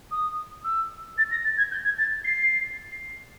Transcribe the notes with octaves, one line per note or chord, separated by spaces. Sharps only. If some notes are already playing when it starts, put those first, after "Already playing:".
D#6
E6
A6
A#6
A6
G#6
G6
G#6
A6
C7